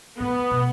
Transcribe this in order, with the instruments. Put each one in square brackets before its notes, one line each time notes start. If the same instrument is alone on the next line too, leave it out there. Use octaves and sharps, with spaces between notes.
[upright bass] A2 [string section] B3
[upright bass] B2